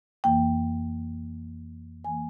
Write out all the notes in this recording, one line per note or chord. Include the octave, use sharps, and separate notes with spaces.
F2 E3 A#3 G5
E3 A#3 G#5